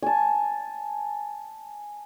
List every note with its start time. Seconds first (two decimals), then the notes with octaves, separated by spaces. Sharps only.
0.02 G#5 A5